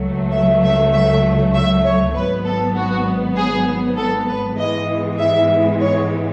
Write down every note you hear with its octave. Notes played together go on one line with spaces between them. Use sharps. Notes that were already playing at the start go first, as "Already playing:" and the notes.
Already playing: C#2 C#3 F#3 A3
E5
E5
E5
E5
C#5
G#1 G#2 F#3 B3 B4
A4
F#4
G#4
A4
B4
G#2 E3 G#3 B3 D#5
E5
C#5